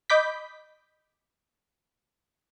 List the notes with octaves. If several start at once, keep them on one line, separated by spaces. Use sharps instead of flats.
D#5 B5 D6 G6 B6